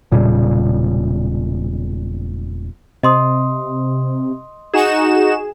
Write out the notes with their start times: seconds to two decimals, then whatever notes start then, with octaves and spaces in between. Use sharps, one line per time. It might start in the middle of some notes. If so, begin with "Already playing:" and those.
0.11 E1 A#2 C#3 G3
3.03 C3 D#5 C6 D#6
4.74 D#4 F#4 G#4 E7